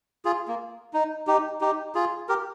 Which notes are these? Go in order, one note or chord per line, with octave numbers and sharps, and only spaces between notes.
F4 G#4
A#3
D#4
D#4 G4
D#4 G4
F4 G#4
G4 A#4